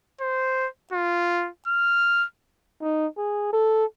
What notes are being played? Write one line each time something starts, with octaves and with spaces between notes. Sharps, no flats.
C5
F4
F6
D#4
G#4
A4